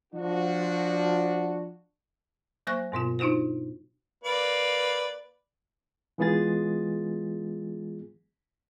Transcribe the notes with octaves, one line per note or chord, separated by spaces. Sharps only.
F3 D4 F4 F#4
F#3 A#3 C5 C#6 F#6 A#6
G2 B2 B3 F4
D4 D#4 F4 F#4 C5
A#3 B4 D5
E3 G#3 B3 F4 G#4 A6